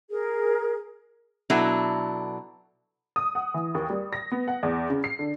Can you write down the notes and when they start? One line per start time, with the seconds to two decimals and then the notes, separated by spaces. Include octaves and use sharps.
0.10 G#4 A#4
1.50 B2 F#3 D4 E4 A4
3.16 D#6
3.35 F#5
3.54 E3
3.75 D#2
3.90 G3
4.13 A#6
4.32 B3
4.48 F#5
4.63 E2
4.90 C#3
5.04 C7
5.19 D3